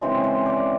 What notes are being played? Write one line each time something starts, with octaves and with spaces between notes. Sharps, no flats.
C#3 E3 G#3 C4 C5
C5
D5